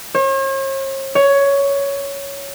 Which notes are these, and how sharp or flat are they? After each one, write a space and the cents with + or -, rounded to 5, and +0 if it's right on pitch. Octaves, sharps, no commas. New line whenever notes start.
C#5 -45
C#5 +10